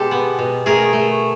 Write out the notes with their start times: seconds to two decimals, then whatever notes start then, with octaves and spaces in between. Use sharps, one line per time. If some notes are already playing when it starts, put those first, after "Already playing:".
Already playing: B2 G#3 G4 A4
0.11 B3
0.39 B2
0.66 A3 G#4 A#4
0.93 A3